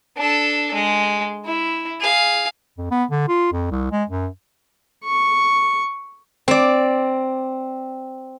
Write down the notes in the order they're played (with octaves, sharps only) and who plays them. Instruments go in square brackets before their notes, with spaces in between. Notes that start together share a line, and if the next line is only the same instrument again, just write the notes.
[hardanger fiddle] D4 A4
G#3
E4
G#4 F5
[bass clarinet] F2
B3
D3
F4
F2
C2
G#3
F#2
[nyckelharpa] C#6
[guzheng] C4 D5